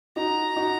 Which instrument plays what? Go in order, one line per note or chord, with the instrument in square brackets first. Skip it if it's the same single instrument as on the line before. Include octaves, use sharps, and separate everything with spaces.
[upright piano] D#4 F#4 [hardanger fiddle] A#5
[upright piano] D#4 F#4